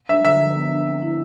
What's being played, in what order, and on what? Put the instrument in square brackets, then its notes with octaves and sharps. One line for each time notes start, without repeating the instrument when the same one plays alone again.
[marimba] D4 [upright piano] E5
[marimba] D3 [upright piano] E5
[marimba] F3
B3
D4
C4
E4